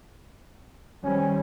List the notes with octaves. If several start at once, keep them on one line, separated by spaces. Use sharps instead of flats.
D#3 G3 C4 C#4